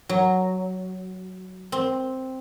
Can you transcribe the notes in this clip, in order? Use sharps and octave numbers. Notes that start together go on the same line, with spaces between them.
F#3
C4